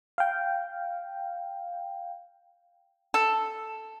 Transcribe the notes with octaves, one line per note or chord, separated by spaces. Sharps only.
F5 G5
A4